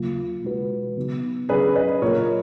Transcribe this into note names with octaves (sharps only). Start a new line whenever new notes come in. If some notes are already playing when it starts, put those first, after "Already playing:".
Already playing: D#2 C#3 F#3 A#3 F4
B2 G#3 D#4 F#4 B4
C#3 F#3 B3 D#4
C#3 F#3 C#4 G#4 B4
B4 D#5
A#2 F#3 A#3 F4 A#4 C#5